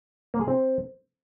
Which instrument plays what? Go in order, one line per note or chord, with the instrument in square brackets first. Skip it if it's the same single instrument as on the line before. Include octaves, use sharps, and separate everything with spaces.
[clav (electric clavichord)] A#3
G#4
C4